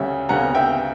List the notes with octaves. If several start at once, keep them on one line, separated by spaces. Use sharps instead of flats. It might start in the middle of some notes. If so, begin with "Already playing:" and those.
Already playing: D2 C#3 G3 C#4 E5
D2 C#3 G3 C#4 F#5 A#5
E5 G5